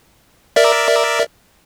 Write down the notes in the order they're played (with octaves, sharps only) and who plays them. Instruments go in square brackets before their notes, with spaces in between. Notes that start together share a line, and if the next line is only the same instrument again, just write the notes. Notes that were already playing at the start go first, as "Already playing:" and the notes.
[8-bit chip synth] A#4 D5 E5